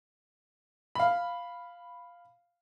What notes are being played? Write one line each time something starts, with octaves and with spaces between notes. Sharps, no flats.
F5 B5